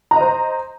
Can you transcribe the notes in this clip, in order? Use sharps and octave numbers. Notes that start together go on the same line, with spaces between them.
C5 D#5 A#5